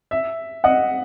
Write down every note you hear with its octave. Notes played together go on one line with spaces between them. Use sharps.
E5
D#5 F#5